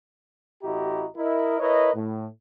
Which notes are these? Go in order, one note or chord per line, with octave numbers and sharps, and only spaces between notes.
A1 E4 F#4 G4 D#5 A#5
E4 A#4 D#5
E4 A#4 B4 C#5 D#5
A2